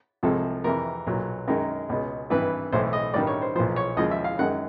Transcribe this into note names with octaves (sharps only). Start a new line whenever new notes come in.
C2 C3 F3 G#3 A4
F2 C3 E3 A#4
B1 A#2 F#3
F#2 D#3 G#3 A#4
C#2 B2 G#3
G#1 G2 E3 B4
B1 A2 E3 C5
D#5
A1 G2 D#3 G3 D5
C#5
C5
B1 A#2 F3 C5
C#5
D#2 C#3 F3 G#3 D#5
E5
F5
F#2 D#3 G#3 F#5